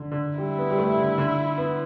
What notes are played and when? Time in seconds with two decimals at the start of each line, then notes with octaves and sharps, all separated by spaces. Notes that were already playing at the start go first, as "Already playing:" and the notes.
Already playing: D3
0.12 D3
0.38 G3 E4
0.58 B3
0.70 G3
0.78 A3
0.98 D3
1.18 D3
1.57 B3